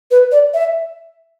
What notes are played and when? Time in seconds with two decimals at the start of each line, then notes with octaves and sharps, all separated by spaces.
0.11 B4
0.32 D5
0.54 E5